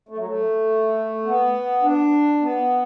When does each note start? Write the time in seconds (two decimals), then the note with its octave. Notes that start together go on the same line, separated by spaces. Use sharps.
0.09 A3
0.17 F#3
0.26 A3
1.26 B3
1.83 D4
2.42 B3